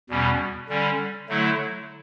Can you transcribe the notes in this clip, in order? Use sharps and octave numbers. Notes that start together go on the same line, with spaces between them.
E2 B2 G3 C#4
D3 G3 C#4
D3 F#3 A3 E4